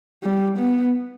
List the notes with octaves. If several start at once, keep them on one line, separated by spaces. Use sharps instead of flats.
G3
B3